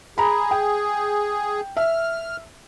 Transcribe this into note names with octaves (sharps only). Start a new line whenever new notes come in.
G#4 A#5 B5
G5
E5 F6